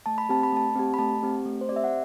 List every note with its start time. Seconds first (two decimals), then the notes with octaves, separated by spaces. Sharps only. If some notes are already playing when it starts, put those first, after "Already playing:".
0.06 A3 A5
0.18 B5
0.29 C4 G4 A5
0.43 B5
0.52 A3 A5
0.76 C4 G4
0.94 B5
0.98 A3 A5
1.23 C4 G4
1.46 A3
1.61 C5
1.69 C4 D5
1.72 G4 E5
1.84 F#5